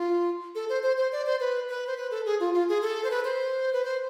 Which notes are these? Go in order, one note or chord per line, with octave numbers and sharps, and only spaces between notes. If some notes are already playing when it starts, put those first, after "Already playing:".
Already playing: F4
A4
C5
C5
C5
D5
C5
B4
B4
C5
B4
A4
G#4
F4
F4
G#4
A4
C5
B4
C5
B4
C5